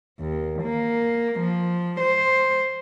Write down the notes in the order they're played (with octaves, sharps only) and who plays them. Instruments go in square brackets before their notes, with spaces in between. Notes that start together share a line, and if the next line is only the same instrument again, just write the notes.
[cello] D#2
A#3
F3
C5